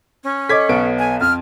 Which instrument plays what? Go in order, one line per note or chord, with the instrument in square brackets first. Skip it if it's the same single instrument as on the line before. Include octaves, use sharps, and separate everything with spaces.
[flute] C#4
[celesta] A4 C#5 D#5 [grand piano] D6 G#6 B6
[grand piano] B1 B3 D7
[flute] G#5
[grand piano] F2 [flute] F6